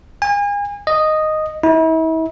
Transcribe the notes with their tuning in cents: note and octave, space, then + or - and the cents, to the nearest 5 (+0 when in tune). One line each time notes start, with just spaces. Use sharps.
G#5 -35
D#5 -5
E4 -40